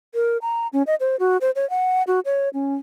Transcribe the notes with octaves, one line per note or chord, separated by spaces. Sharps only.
A#4
A#5
C#4
D#5
C5
F#4
C5
C#5
F#5
F#4
C#5
C#4